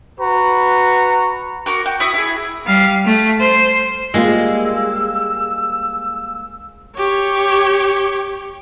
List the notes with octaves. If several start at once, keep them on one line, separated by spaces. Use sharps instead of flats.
F#4 B4 A#5 C#6
F#4 A#4 D6
F#4 G5
E4 F#4 E5 D#6
E4 G#4
G3 F5
A3
C5
G3 G#3 A#3 F4 E6
G4 C#5